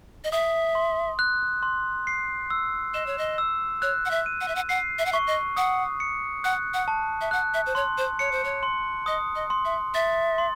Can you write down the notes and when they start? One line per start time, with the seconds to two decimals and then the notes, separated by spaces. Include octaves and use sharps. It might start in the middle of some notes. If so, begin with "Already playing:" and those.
0.24 D#5
0.32 E5 D#6
0.75 C6
1.19 F#6
1.63 C6
2.07 C7
2.50 E6
2.94 D#5 E7
3.06 C#5
3.18 D#5
3.38 E6
3.82 C#5 F#6
4.05 F#5
4.11 E5
4.26 D#7
4.41 F#5
4.48 E5
4.55 F#5
4.69 F#5 C7
4.98 E5
5.05 F#5
5.12 E5 C#6
5.27 D#5
5.56 F#5 D#6
6.00 C#7
6.44 F#5 F#6
6.74 F#5
6.88 A5
7.21 E5
7.31 F#5 F#6
7.54 E5
7.66 C5
7.75 C#5 C6
7.98 C5
8.19 C#5 C#7
8.32 C5
8.44 C#5
8.63 C6
9.06 D#5 D#6
9.35 D#5
9.50 C6
9.65 E5
9.94 E5 A6
10.38 C6